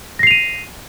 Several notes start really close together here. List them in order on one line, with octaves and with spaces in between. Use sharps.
A#6 C7 F7 D#7